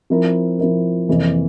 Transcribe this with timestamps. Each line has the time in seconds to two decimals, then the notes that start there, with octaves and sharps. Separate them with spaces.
0.10 F3 C4 E4 A#4
0.59 F3 C4 E4 A#4
1.08 F2 C3 E3 A#3